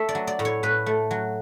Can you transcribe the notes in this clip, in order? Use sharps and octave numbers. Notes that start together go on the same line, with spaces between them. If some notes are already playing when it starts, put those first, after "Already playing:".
Already playing: A3 E5
D5
F#3
D5
A2
C#5
A2 B4
A3
F#3